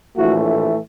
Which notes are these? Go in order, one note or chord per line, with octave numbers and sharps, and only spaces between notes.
A#1 A2 E3 A3 E4 F#4